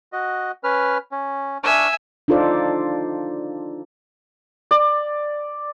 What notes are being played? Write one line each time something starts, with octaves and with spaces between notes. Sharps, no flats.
F#4 D#5
C#4 B4 F6
C#4
D4 E5 G#5 C#6 F6
D4 D#4 F4 A4 C5 D5
D5